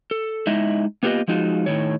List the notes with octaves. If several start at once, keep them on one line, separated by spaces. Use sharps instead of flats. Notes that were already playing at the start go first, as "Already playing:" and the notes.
A4
G#3 D#4 E4 D#5 E5
A#3 B3 F4 G4 B4 D#5
F3 G#3 D#4 F4 F#4
A2 D#3 C#5